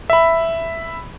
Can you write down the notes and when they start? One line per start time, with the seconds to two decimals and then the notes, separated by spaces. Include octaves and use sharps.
0.10 E5 B5